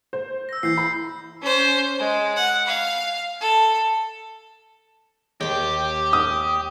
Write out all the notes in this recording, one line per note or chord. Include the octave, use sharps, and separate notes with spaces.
C5
E6 A#6
E3 G6 C7
B5
C#4 C5
G#3
F#5
F5
A4
D#2 G4
D#6